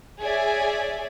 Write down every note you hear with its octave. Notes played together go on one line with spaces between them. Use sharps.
G#4 C#5 D5 E5 G#5